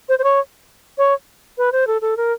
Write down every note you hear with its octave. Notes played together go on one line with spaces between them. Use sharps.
C5
C5
C#5
C#5
B4
C5
A4
A4
A#4